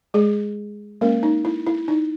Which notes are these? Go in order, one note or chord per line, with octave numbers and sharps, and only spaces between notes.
G#3 G#4
G#3 A#3 C#4 A#4
D#4
E4
E4
D#4